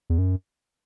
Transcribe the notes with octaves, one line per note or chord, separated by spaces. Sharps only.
E2
F#2